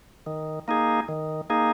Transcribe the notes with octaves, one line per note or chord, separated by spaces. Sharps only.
D#3
A#3 D#4 G#4
D#3
A#3 D#4 G#4